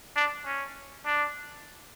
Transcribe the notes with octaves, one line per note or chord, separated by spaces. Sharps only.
D4
C#4
D4